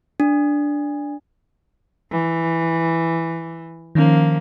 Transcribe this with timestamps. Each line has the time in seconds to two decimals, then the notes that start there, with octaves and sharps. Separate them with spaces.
0.20 D4
2.10 E3
3.95 D#3 F3 A#3 C#4